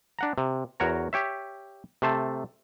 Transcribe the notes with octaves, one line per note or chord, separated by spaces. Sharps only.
D4 F#5 A#5
C3
E2 F#4 A#4 C#5 A#5
G4 C#5 E5
C3 A3 C5 A5